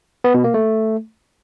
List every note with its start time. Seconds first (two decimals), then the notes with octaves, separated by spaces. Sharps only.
0.24 B3
0.34 B2
0.44 A#3
0.54 A3